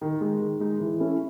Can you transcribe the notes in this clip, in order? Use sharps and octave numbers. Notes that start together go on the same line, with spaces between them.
D#3
G#3 D#4
D#3
G#3 D#4
E3
A3 C#4 E4